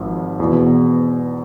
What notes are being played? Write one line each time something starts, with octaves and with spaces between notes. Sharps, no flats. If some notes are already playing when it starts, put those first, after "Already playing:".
Already playing: G#1 G#2 F3
E2 B2